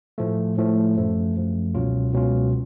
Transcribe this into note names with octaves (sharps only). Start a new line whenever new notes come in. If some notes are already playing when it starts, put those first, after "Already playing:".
A2 F3 A3
A2 F3 A3
F#2 F3 A3
F#2 F3 A3
C#2 B2 F#3 C#4 F4
C#2 B2 F#3 C#4 F4